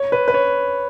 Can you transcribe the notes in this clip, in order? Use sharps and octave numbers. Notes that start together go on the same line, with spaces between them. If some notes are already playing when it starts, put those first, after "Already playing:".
Already playing: C#5
B4
B4
C#5